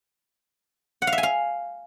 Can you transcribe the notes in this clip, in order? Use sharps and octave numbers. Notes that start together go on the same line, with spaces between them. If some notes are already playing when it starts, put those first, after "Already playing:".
F#5
F5
E5
G#5
F5